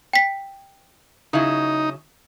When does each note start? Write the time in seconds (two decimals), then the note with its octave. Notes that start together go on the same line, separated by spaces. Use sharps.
0.13 G5 B6
1.33 C#3 F#3 D#4 E4